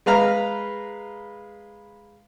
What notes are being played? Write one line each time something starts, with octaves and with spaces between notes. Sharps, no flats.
G#3 B4 F5 A#5